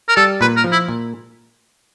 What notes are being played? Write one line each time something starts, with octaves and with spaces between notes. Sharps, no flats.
A#4
G3 A4
A#2 B4
A#4
F3
E4
A#2